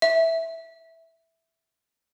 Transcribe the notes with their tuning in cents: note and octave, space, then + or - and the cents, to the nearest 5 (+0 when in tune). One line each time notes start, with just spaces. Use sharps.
E5 -5